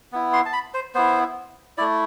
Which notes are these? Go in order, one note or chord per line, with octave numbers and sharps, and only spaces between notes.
B3 E4
C6
A5
B5
C5
B3 E4 C5
A3 E4 D5